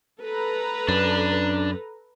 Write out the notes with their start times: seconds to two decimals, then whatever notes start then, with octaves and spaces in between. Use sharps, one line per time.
0.21 A4 B4 A#5
0.89 F#2 D4